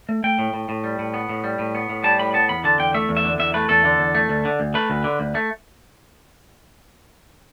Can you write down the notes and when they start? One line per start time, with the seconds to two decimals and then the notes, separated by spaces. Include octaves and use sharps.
0.09 A3
0.24 A3 G5
0.39 A2
0.54 A2
0.69 A2
0.84 G3
0.99 A2
1.14 B3
1.29 A2
1.44 G3
1.59 A2
1.75 B3
1.89 A2
2.04 G3 A5
2.19 A2 B5
2.34 B3 A5
2.49 E2 B5
2.64 D3 A5
2.79 E2 G5
2.94 A3 E5
3.09 E2
3.17 E5
3.24 D3
3.39 E2 E5
3.54 A3 B4
3.69 E2 A4
3.85 D3
4.00 E2
4.15 A3
4.29 D2
4.45 D3
4.60 D2
4.74 A3 B4
4.90 D2
5.04 D3
5.20 D2
5.35 A3